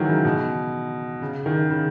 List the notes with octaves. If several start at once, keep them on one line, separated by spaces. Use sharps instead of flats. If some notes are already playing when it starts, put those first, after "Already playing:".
Already playing: D#3 E3 F#3 G#3
C#3
B2
C#3
D#3
C#3